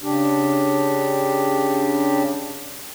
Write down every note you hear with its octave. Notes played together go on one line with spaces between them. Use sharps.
C#3 D4 G4